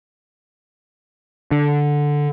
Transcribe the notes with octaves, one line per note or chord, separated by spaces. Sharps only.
D3